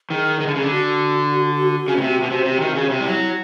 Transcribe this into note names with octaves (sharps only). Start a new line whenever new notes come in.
D#3 G#4
D#3
D3
C#3
D3
F#4
C#3
B2
C3
B2
C3
C3
D#3
C#3
C3
G3
F#3 E4